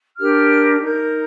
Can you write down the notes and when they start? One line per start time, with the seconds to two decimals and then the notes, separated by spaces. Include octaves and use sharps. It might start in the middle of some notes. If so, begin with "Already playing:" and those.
0.17 D4 G4 A#4 F6
0.80 D#4 A#4 G6